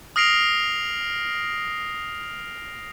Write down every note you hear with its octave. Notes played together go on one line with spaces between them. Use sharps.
D#6 F6 A#6 C7 D7 F7